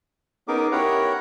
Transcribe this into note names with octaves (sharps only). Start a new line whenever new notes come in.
B3 C#4 D#4 G#4 A#4 D6
E4 G4 A#4 C#5 F#5 A#5